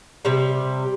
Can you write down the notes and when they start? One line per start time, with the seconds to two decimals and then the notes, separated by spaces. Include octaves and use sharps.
0.25 C3 G3